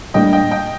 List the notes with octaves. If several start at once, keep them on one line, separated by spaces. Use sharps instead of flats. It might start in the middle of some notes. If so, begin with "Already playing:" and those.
A2 G3 A#3 D4 D#5 G5
D#5 G5
D#5 G5